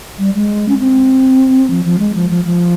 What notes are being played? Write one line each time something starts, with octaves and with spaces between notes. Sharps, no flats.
G3
G#3
C#4
C4
F3
F3
G#3
F3
F3
F3